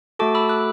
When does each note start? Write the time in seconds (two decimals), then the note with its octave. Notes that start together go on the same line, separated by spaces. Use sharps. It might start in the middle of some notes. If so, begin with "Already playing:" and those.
0.19 A3 F#4 A4 A5 D6
0.35 B5 E6
0.49 D6 F#6